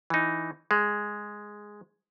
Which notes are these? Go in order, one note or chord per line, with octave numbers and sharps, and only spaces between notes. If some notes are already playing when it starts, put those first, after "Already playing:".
E3 D#4
G#3